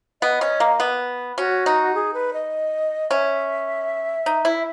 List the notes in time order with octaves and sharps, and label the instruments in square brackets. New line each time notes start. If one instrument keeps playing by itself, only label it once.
[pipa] B3 [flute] D#5
[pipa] C#4
A#3
B3
[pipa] C#4 [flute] F#4
[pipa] D#4
[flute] G#4
B4
D#5
[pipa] C#4 [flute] E5
[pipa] D#4
E4